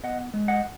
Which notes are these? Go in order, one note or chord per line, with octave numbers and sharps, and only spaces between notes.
B3 D#5 F#5
G#3
D#5 F#5